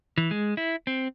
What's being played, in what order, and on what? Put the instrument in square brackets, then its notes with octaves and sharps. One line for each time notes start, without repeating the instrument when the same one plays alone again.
[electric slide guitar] E3
G#3
E4
C4